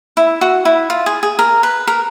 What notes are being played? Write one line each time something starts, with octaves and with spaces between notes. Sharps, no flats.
E4
F#4
E4
F4
G#4
G#4
A#4
B4
A#4